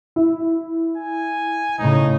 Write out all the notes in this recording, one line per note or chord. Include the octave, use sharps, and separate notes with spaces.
E4
G#5
A2 C#3 D#4